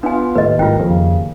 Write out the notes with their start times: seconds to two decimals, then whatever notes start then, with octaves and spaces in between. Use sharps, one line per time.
0.03 B3 D4 F4 G#5
0.35 D#2 A2 B4 D#5
0.59 G#1 F4 A#4 G5
0.80 F2 C#3